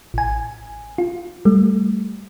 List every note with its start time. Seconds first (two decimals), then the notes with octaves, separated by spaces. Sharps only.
0.14 A1 G#5
0.98 F4
1.45 G3 A3